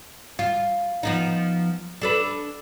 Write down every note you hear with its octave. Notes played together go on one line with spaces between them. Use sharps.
F4
F3 B3 D#4
D4 A4 B4